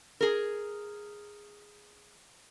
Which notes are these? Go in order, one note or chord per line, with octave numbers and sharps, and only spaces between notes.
G#4 A#4